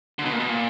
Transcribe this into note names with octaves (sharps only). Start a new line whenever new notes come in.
D3
B2
A#2
B2
A#2